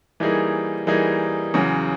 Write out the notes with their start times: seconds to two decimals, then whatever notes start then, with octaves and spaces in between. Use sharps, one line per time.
0.20 E3 G3 A#3 D#4 G#4
0.87 E3 G3 A#3 D#4 G#4
1.54 E2 C#3 F#3